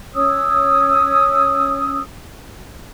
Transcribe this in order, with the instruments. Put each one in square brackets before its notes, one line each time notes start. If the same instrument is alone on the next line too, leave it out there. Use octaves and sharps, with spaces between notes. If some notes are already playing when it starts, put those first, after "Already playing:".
[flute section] C#4 C#5 D#6 E6